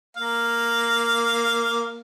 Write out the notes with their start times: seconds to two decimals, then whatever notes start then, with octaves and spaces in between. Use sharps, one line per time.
0.17 A#3 F5